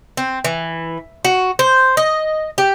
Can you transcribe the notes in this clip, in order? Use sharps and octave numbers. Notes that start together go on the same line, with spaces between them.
C4
E3
F#4
C5
D#5
G4